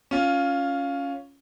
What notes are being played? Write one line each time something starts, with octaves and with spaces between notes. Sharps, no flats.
C#4 F4